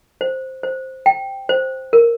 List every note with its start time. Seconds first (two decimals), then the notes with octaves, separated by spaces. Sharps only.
0.21 C5
0.63 C5
1.06 G5
1.49 C5
1.93 A#4